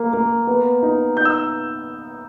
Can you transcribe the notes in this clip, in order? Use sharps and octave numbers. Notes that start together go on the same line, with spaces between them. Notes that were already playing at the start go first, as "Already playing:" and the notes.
Already playing: A#3
A#3
B3
D#4
D#4 G6
E6